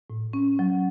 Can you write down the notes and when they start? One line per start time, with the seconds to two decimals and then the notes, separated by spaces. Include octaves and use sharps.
0.10 A2
0.33 C#4
0.59 F#3